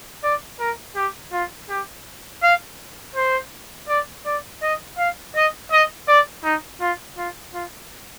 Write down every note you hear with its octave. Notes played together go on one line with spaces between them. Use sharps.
D5
A#4
G4
F4
G4
F5
C5
D5
D5
D#5
F5
D#5
D#5
D5
D#4
F4
F4
F4